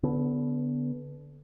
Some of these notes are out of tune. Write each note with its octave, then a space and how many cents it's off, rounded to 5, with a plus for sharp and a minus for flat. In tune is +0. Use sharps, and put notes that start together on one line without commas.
D3 -25 B3 +0